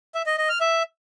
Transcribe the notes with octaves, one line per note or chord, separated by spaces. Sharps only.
E5
D#5
D#5
F6
E5